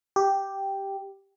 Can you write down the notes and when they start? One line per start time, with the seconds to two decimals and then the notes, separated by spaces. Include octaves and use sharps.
0.16 G4